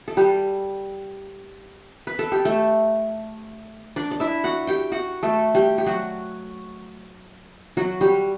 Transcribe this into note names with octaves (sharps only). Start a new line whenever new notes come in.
A4
G3 G4
B4
A4
G4
A3 A4
D4 D5
D5
E4 E5
F#4 F#5
G4 G5
F#4 F#5
A3 A4
G3 G4
G4
F#3 F#4
F#3 F#4
G3 G4